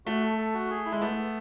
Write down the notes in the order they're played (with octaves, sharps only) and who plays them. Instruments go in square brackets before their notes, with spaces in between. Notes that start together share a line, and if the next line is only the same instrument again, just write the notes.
[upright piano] A3 [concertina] F#4
[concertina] A4
A4
F#4
G#4
E4
[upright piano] G#3
[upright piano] A3 [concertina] B3
[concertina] B3